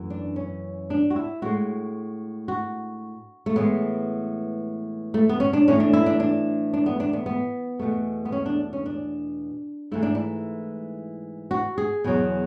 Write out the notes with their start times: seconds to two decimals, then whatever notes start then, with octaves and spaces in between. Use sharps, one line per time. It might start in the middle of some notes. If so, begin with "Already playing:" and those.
Already playing: F#2 E3 A3
0.10 D4
0.36 C#4
0.90 D4
1.10 F#4
1.16 E4
1.42 A2 G#3 F#4
2.48 F#4
3.46 A3
3.56 A2 E3 G#3 B3
5.14 A3
5.29 B3
5.40 C#4
5.53 D4
5.68 A2 E3 A3 C#4
5.80 D4
5.93 E4
6.06 D4
6.20 D4
6.73 D4
6.86 B3
7.00 D4
7.13 B3
7.26 B3
7.79 E2 B2 A3
8.25 B3
8.32 C#4
8.46 D4
8.73 C#4
8.86 D4
9.92 G#2 E3 A3 E4
10.03 D4
10.15 E4
11.51 F#4
11.78 G#4
12.04 E2 B2 F#3